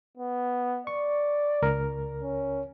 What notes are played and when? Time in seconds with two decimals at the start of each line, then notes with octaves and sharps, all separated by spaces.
0.17 B3
0.87 D5 C#6
1.62 C#2 A#4
2.23 C#4